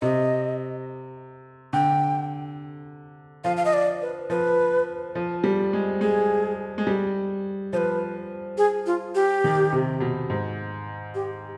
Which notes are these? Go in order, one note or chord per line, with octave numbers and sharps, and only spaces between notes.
C3 D#5
D3 G5
F3 F5
F5
D#5
D5
B4
F3 B4
F3
G3
G#3
G#3 G#4
G#3
G3
F3 B4 C5
G#4
F4
G4
D#3
C3
B2
G#2
G4